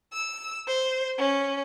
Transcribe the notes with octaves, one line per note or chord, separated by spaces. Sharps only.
E6
C5
C#4